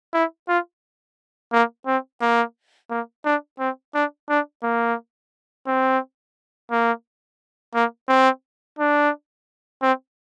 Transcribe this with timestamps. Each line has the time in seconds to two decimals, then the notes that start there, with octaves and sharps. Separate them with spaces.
0.14 E4
0.48 F4
1.52 A#3
1.87 C4
2.22 A#3
2.90 A#3
3.25 D4
3.59 C4
3.94 D4
4.29 D4
4.63 A#3
5.67 C4
6.71 A#3
7.74 A#3
8.08 C4
8.79 D4
9.82 C4